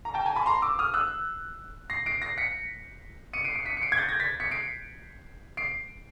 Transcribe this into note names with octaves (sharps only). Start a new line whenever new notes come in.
A#5
G5 A5
G#5 A#5
A5 B5
A#5 C6
D6 E6
D#6 F6
E6 F#6
A#6 C7
C7 D7
A#6 C7
B6 C#7
C#7 D#7
C7 D7
C7 D7
B6 C#7
C#7
C7 D7
G#6
G6 A6
G#6 A#6
A6 B6
B6 C#7
C7 D7
C7 D7